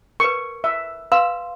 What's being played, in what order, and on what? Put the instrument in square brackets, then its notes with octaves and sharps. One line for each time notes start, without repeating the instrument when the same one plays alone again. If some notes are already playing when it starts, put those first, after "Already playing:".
[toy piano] A#4 B4 [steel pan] C#6
[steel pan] E5
[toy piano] B4 F5 C6 [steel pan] E6